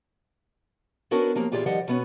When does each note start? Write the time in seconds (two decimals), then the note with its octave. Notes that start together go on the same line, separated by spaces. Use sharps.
1.11 B3 C#4 D4 F#4 A#4 B4
1.35 F3 F#3 A#3 G4
1.52 A#2 E3 F4 G4 G#4 D5
1.66 D#3 F3 G3 D5 D#5 F#5
1.88 B2 B3 C#4